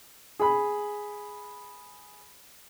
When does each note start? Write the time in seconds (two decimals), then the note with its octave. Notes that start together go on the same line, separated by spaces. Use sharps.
0.39 G#4 B5